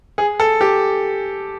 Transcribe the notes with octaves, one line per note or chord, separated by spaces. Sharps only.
G#4
A4
G4